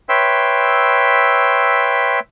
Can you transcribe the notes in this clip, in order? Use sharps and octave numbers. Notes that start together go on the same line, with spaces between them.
B4 C#5 E5 G5 C6 E6